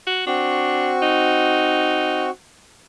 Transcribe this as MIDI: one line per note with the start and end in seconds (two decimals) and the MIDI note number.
0.07 0.26 66
0.27 2.30 60
0.27 0.94 62
0.27 2.30 66
0.27 2.30 85
1.02 2.26 63